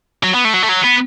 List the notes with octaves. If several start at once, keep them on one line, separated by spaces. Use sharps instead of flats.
F#3
B3
A3
F#3
A3
F#3
B3